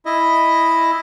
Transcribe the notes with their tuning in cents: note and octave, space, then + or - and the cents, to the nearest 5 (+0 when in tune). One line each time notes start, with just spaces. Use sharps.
E4 +0 D#5 +0